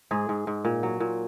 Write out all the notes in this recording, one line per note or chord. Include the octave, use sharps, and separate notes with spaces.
G#2 G#4
G#2
G#2
A#2
F#3
A#2